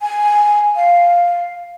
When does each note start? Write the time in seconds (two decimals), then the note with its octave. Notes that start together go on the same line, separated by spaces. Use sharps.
0.01 G#5
0.76 F5